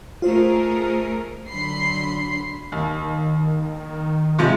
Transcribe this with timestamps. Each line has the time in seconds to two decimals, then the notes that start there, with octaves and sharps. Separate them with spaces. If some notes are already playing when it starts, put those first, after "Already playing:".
0.22 A3 F4 G#4 A#4 C5
1.48 D3 F#3 B5 C6 C7
2.72 D#2 D#3
4.39 C3 F3 G#3